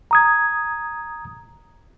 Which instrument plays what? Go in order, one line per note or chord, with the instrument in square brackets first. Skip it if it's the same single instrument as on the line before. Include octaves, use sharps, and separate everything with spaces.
[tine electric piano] A#5 D#6 G#6